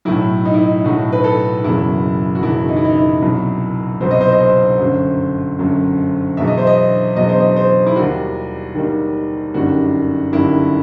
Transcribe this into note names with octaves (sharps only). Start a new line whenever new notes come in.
B1 A2 F#3 E4
D#4
E4
D#4
B1 A2 F#3 F#4
B4
A4
F#1 E2 B2 F#3 E4
F#4
F#1 E2 B2 F#3 E4
D#4
E4
D#4
E4
C2 B2 F#3
C2 B2 F#3 C5
D#5
C5
D#5
C5
G1 F#2 F#3
G1 F#2 F#3
E2 B2 F#3 E5
D#5
C5
D#5
E2 B2 F#3 D#5
C5
D#5
C5
E4
D#2 D#3 G3 F#4
D#2 D#3 G3
G1 F#2 D#3 G3 F#4
G1 F#2 D#3 G3 E4